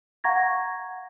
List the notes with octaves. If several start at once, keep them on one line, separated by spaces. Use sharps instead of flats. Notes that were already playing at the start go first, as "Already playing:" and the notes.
F5 F#5 A#5 C#6 G#6 A#6